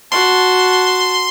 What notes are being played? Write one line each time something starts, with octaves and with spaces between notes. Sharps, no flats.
F#4 A5 C6